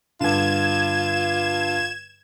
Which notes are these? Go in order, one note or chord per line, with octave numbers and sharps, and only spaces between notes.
G2 D3 F4 G#6 E7